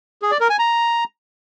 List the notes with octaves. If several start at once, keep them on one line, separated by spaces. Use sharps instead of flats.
G#4
D5
A#4
G#5
A#5